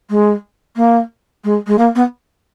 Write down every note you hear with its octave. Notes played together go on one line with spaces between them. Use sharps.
G#3
A#3
G#3
G#3
A#3
B3